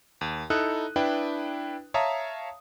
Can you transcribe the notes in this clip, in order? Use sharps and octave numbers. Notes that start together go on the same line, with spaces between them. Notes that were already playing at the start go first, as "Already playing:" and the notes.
D#2
D#4 E4 A4 D#6 F#6
D4 E4 B4 G5
C#5 E5 F5 A5 A#5 D#6